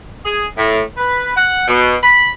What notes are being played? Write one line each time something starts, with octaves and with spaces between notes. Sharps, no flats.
G#4
A2
B4
F#5
B2
B5